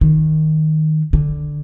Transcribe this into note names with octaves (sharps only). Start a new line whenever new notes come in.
D#3
D3